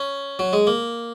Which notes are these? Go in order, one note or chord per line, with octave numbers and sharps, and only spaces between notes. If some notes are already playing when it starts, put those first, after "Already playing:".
Already playing: C#4
F#3
G#3
A#3